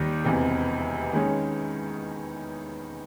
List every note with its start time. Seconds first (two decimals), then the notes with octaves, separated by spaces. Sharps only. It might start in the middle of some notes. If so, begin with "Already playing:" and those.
Already playing: D#2 D#3 G3
0.24 E1 E2 C3
1.13 D#3 G#3 C#4